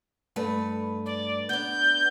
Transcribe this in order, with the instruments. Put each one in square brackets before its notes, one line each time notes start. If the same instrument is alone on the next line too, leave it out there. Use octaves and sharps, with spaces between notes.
[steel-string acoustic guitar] G2 A3 B4
[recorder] D5
[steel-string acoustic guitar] B3 D4 [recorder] G6